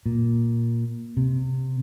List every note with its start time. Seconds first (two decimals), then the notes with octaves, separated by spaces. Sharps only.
0.06 A#2
1.17 C3